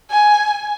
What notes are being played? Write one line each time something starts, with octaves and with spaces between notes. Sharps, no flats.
G#5